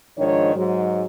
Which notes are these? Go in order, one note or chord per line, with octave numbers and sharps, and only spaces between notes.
G#2 D#3 F3 D4 C#5
G#2 F#3